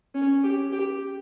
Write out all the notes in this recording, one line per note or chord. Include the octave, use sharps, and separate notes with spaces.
C#4
G4
G4